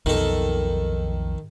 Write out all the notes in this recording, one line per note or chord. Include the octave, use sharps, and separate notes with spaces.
B1 F2 D#3 A4